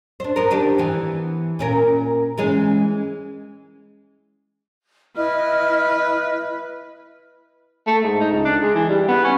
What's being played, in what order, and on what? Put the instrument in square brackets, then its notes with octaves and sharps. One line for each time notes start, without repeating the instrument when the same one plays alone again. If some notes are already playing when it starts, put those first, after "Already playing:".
[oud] D4 C5
B3 A#4
D#3 D4 G4
E3 B3
A#2 C#4 A#4
E3 G#3 C#4
[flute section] E4 D#5 F6 [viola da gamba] B4
[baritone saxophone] A3
G#2
D#4
C#2
D4
G#3
E3
G3
B3
C#4